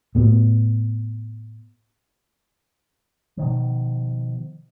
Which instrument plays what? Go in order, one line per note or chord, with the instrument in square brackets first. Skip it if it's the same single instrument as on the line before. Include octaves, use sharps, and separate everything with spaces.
[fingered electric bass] A2 B3
[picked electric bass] B2 D#3 F3